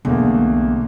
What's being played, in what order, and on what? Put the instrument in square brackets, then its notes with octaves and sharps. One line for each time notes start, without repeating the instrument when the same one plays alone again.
[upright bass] B1 [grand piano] E2 [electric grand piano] D3 A3 A#3